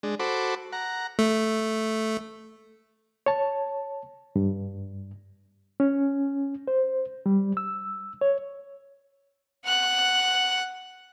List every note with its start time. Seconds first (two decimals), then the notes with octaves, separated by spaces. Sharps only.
0.03 G#3 D4
0.20 F#4 A4 C5 B5 D6
0.72 F#5 A#5
1.19 A3
3.26 C#5 A5
4.36 G2
5.80 C#4
6.68 C5
7.26 G3
7.57 E6
8.21 C#5
9.66 F#5 F#6